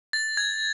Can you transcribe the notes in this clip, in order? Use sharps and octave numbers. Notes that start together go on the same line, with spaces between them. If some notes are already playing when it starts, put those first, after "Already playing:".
A6
G#6